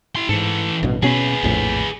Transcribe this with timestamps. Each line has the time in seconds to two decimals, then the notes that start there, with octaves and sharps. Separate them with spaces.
0.16 E4 C6
0.29 G#2 E3 A4
0.83 A1 G2 B2
1.03 B2 B3 C#4 G#4 B4
1.43 A#1 F2 A2